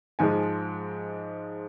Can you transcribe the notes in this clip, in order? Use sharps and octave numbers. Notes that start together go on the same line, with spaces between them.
G#2 F3 G#3 G#5